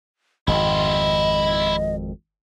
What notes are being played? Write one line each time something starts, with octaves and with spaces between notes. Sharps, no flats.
G#1 F2 E4 F4 D#5